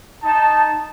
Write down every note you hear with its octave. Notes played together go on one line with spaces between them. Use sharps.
D#4 A5